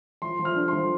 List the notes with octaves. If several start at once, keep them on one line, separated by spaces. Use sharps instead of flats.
F3 C6
F3
F6
D4
F3 C6